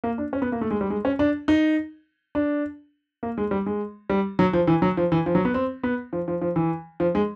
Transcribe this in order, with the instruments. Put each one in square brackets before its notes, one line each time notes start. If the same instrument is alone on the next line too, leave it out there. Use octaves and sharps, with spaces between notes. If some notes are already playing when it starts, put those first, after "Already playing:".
[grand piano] A#3
D4
C#4
B3
A#3
A3
G#3
G3
G#3
C#4
D4
D#4
D4
A#3
G#3
G3
G#3
G3
F#3
F3
E3
F#3
F3
E3
F3
F#3
B3
C4
B3
F3
F3
F3
E3
F3
G#3